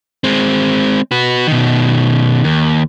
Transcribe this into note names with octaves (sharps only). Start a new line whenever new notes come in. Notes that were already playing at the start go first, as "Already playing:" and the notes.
G#3 C4
F#4 B4
B2 D#3
D#2